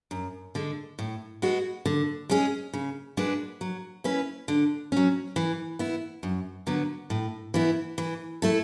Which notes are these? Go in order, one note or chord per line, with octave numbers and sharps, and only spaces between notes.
F#2
D3 G#3
A2
G#3 B3 F#4
D3
G#3 C#4 G#4
C#3
G#3 D4 F#4 B4
F#3
C#4 E4 B4
D3
F#3 C#4
E3
B3 E4
F#2
D3 F#3 B3
A2
E3 B3 E4
E3
A3 E4 A4